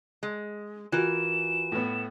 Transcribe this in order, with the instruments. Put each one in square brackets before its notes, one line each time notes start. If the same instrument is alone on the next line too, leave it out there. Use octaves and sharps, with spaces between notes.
[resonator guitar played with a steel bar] G#3
[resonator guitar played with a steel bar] E3 A#4 [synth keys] F4 F#4 [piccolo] E7
[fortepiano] A2 B3